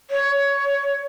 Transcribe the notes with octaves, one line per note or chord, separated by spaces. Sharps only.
C#5